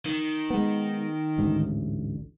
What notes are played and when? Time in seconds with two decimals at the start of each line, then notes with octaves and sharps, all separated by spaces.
0.05 D#3
0.50 G#3 B3
1.38 A1 D2 G#2